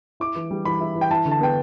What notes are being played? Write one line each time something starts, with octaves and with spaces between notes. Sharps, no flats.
E4 D6
E3
G3
E3 B5
E4
E3
G5
E4 A5
D3
A5
B3 G5